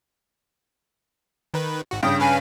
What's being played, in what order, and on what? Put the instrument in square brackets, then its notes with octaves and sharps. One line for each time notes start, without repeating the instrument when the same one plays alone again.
[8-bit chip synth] D#3 B4
G#1 F#4
[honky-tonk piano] G2 C#3 [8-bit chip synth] G5 [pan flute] D#6
[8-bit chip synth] C#4 B4 F5 [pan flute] G#5